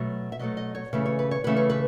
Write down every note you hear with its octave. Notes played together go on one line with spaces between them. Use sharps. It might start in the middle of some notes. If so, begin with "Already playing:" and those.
Already playing: B2 F#3 A3
E5
B2 F#3 A3 D#5
D#5
C#5
C#3 E3 A3 C#4 B4
C#5
B4
C#5
C#3 E3 A3 C#4 B4
C#5
B4